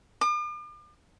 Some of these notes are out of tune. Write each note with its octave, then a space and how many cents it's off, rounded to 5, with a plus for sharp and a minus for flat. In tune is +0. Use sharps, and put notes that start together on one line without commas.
D6 +45